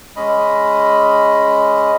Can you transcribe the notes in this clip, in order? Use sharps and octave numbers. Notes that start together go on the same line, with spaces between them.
G#3 C#4 D#5 B5